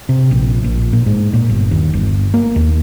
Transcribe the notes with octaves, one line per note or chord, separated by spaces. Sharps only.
C3
A#1
A#1
A#2
G#2
A#2
G1
D#2
G1
A#3
D#2